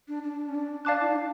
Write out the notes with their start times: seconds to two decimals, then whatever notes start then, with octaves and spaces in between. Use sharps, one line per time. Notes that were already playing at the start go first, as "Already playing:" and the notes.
0.08 D4
0.24 D4
0.49 C#4
0.55 D4
0.85 D4 D5 F5 A5 D6 F#6
1.00 E4
1.08 D#4
1.16 D4